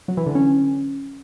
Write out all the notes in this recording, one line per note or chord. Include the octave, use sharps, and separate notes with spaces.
F#3
E3
D3
C#4